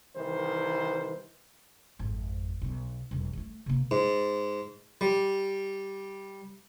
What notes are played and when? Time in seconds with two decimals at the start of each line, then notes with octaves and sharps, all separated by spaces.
0.16 C2 D#3 E3 C5
1.99 G#1 F2
2.62 B1 B3
3.11 E1 B1
3.33 G3 A3
3.66 C3 A#3
3.91 G#2
5.01 G3